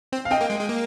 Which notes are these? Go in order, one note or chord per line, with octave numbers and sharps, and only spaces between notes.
C4
F5
C4 D#5 G5
A#3
G#3
G#3
A#3